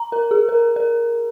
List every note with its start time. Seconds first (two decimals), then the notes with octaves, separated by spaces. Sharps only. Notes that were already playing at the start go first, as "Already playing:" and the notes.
Already playing: A#5
0.12 A#4
0.31 G#4
0.49 A#4
0.76 A#4